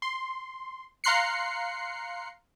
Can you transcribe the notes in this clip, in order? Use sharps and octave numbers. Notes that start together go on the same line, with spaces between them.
C6
F5 A#5 C6 F#6 C7 C#7